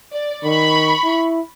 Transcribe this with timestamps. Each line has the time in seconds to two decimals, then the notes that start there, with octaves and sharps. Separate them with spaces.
0.12 D5
0.44 D#3 B5 C#6
1.04 E4